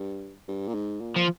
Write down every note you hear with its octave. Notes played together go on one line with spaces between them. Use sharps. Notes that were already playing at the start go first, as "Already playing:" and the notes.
Already playing: G2
G2
A#2
G#2
A#2
F3